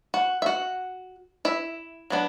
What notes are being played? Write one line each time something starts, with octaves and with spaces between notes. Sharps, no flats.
F#4 F#5
E5
F#4 F#5
E4 E5
F#3 B3 D4